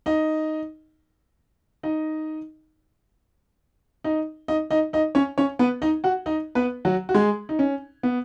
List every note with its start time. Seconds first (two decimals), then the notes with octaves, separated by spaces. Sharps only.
0.06 D#4 D#5
1.83 D#4 D#5
4.04 D#4 D#5
4.48 D#4 D#5
4.71 D#4 D#5
4.93 D#4 D#5
5.15 C#4 C#5
5.38 C#4 C#5
5.59 B3 B4
5.82 D#4 D#5
6.04 F#4 F#5
6.26 D#4 D#5
6.55 B3 B4
6.85 F#3 F#4
7.09 F#4
7.14 G#3 G#4
7.49 D#4
7.59 C#4
8.03 B3